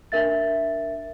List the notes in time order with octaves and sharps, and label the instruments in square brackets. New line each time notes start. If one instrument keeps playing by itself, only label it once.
[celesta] D4 A#4 E5 A6